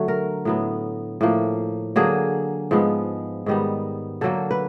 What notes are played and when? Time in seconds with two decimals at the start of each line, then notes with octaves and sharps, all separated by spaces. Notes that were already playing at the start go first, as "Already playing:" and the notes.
Already playing: D3 F#3 A3 F#4
0.08 A#4
0.45 A2 F#3 B3
1.21 A2 F3 A#3
1.96 D3 F#3 A#3 G#4
2.71 G#2 F3 G#3 B3
3.46 G#2 D#3 G3 B3
4.21 D3 F#3 A#3 A4
4.51 B4